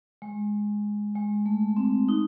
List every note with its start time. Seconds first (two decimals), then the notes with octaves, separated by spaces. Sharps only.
0.22 G#3
1.16 G#3
1.46 A3
1.77 C4
2.09 D#4